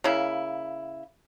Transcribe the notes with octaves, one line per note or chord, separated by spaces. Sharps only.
C#3 A#3 E4